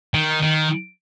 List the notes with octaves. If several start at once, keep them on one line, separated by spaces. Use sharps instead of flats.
D#3
D#3